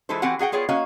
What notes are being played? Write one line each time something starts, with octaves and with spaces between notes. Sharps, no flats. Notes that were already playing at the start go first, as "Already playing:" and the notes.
E3 G#3 E4 F4 A4 C5
E3 C4 F#4 G4 F#5 G#5
F#4 G#4 F#5 G5
B3 F4 G#4 C#5 G5
A#3 C#4 F#4 D#5 F5